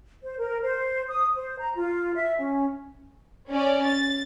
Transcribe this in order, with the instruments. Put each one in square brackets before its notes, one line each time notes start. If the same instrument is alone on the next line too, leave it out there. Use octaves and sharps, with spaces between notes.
[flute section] C5
A#4
C5
D#6
C5
A#5
F4
E5
C#4
[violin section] C#4 D5
A6